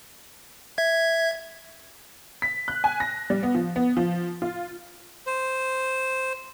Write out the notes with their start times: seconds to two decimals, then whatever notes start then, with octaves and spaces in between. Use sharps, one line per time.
0.78 E5 G#6
2.42 B6
2.68 F#6
2.84 G#5
3.00 A#6
3.30 G3
3.43 B3
3.55 F3
3.76 B3
3.97 F3
4.42 F4
5.27 C5